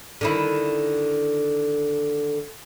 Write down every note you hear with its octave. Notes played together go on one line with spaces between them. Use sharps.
D3 D#3 E4